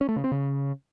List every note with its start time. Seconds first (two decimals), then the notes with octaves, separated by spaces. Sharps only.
0.01 C#4
0.09 A3
0.16 C#3
0.24 C4
0.32 C#3